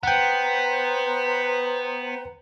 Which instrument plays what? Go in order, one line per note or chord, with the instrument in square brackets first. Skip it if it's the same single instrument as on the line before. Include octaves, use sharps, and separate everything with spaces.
[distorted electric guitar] B3 [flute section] B4 C5 A#5 [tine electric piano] F#5 G5